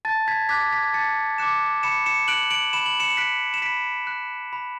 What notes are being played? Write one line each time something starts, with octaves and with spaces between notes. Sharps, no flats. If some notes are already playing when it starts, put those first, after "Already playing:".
A5 A6
G#6 B6
D6 F#6 G#6 B6
G#6 B6
A5 A6 C#7
D6 F#6 C#7 E7
B5 C#7 E7
C#7 E7
F#6 D7 F#7
D7 F#7
B5 E7
F#7
C#7 E7
E7
F#6 B6 D7
E7
B5 B6 D7
F#6
B5